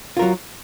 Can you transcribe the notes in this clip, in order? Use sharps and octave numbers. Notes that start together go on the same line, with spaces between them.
F#3 F4 A#4